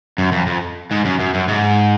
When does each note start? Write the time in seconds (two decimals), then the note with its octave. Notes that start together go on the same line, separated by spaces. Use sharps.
0.18 F#2
0.32 F2
0.47 F2
0.91 G#2
1.05 F#2
1.19 F#2
1.34 F#2
1.48 G#2